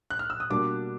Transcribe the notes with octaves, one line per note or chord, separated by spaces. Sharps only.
F#6
F6
E6
D#6
B2 G3 A#3 D4 D6